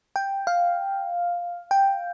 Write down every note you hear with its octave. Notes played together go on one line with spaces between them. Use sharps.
G5
F5
G5